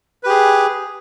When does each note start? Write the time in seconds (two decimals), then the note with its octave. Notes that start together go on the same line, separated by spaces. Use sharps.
0.23 B4
0.26 G4
0.29 G#4